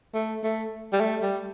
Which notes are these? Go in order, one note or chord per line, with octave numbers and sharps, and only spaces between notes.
A3
A3
G3
A3
G3